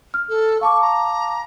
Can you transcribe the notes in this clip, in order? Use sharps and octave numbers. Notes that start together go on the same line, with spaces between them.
F6
A4
F5 A5 C#6 D6
A#5